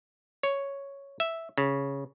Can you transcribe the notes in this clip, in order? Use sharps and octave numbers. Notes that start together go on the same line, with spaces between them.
C#5
E5
C#3